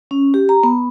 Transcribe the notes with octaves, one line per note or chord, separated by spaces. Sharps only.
C#4
G4
A#5
B3